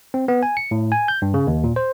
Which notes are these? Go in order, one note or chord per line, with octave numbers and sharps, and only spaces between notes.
C4
B3
G#5
C#7
A2
G#5
G6
G2
C#3
D#2
A#2
C5